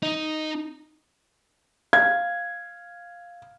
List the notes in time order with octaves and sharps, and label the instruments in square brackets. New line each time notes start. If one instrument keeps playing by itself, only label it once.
[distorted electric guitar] D#4
[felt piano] F5 G#6